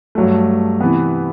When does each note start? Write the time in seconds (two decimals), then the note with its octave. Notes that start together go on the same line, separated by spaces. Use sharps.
0.15 G2 F#3 A3
0.81 C3 E3 B3